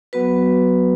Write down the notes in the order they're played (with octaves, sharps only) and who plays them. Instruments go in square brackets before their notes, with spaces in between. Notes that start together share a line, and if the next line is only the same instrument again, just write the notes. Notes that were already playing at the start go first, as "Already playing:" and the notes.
[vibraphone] F#3 B3 F#4 B4